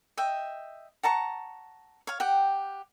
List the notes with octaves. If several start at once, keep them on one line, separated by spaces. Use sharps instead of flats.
D#5 E5 G5
F#5 A5 A#5 C#6
C#5 F5
G4 F#5 G5